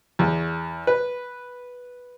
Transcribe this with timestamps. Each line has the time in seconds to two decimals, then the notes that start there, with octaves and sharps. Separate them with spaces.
0.19 E2
0.87 B4